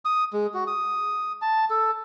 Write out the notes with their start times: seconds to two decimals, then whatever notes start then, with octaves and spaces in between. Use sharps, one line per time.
0.05 D#6
0.33 G#3
0.54 F#4
0.67 D#6
1.42 A5
1.70 A4